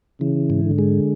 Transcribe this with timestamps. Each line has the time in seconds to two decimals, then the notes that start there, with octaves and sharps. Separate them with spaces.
0.21 C#3 E3
0.50 G#2
0.65 D3
0.79 G#3